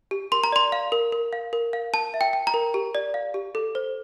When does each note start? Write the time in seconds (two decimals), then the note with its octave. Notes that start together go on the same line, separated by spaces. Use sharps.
0.11 G4
0.32 A#4 C6
0.44 A#5
0.52 D5 C6
0.72 F5
0.92 A#4
1.12 A#4
1.33 F5
1.53 A#4
1.73 F5
1.93 A#4 A5
2.14 E5
2.21 G5
2.33 G5
2.47 A#5
2.54 A#4
2.74 G4
2.95 D5
3.14 F5
3.34 G4
3.55 A4
3.75 C5